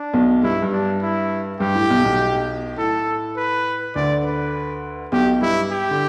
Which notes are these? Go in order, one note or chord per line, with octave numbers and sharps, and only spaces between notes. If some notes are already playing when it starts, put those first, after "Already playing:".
Already playing: D4
B1 B2
G2 E4
G2
D4
E4
G2 G4
A2
B1 B2
B1 B2
A2 A4
B4
D2 D3 D5
B4
B1 B2 G4
G2 E4
G4
D3